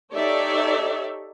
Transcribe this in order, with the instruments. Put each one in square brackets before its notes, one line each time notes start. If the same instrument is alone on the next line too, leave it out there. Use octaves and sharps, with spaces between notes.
[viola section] D#4 G4 A4 C#5 D5 E5